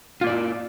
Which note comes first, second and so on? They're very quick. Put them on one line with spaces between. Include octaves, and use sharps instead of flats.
F4 A#3 D5 E4